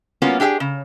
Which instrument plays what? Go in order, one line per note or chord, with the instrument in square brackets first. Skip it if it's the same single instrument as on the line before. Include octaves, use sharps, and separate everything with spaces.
[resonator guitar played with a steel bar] G3 A#3 B3 C#4 F4 F#4
D4 G4 G#4 D#5 G5
C#3